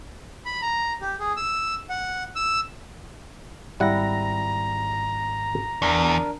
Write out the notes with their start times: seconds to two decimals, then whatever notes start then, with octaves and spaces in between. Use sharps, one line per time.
0.45 B5
0.62 A#5
1.01 G4
1.20 G#4
1.37 E6
1.89 F#5
2.36 E6
3.80 G#1 G3 E4 F#5 A#5 A#6
5.82 E2 D4 A#4